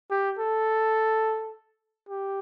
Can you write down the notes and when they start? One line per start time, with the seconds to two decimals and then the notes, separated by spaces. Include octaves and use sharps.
0.11 G4
0.39 A4
2.09 G4